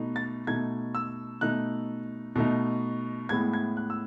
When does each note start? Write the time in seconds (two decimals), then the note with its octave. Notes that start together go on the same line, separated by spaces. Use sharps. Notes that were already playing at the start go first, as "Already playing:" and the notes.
Already playing: B2 A3 D#4
0.16 A6
0.47 B2 A3 D#4 G#6
0.95 E6
1.41 B2 A3 D#4 F#6
2.36 B2 A3 D#4
3.29 A2 G#3 B3 E4 G#6
3.53 G#6
3.77 F#6
3.90 E6